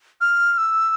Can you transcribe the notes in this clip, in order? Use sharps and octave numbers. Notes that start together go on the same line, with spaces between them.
F6
E6